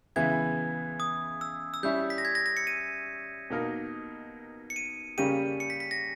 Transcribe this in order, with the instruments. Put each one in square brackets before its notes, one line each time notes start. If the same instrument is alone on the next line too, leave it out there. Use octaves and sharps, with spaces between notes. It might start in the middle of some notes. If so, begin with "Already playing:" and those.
[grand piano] C#3 E3 G#3 B3 E4 [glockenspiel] G#6
[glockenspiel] D#6
E6
E6
[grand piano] G3 C#4 E4 [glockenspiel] G6
[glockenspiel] B6
A#6
G#6
A#6
A#6
C#7
D#7
[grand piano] B2 A#3 D#4 A#4
[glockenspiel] C#7
D#7
[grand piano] C#3 G3 A#3 C#4 G4 [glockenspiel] D#7
[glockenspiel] C#7
B6
B6
A#6